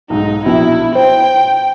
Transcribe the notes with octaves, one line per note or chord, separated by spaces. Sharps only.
B1 G#2 D#4
A#1 B2 E4
C5 G5